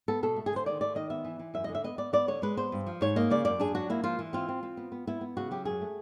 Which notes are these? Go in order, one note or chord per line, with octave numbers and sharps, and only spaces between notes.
B3 A4
B2 A4
A3
G#4
D3 C5
D#3 D5
A3 D5
D#3 D#5
B3 E5
E3
E3
F#2 E5
D3 D#5
E5
B3 D#5
B3 D5
B3 D5
D3 C#5
G#3 B4
B3 C5
G2
F3
G#2 C#5
A#3 D#5
C#3 D5
F#2 D5
D4 G#4
F#3 F#4
A#3 E4
F3 F4
E3
C4 F4
C4
C4
B3
B3
B3 E4
B3
C#3 F#4
F#3 G4
F#2 G#4
A3